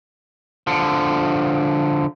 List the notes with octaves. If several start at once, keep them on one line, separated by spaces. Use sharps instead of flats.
D3 F3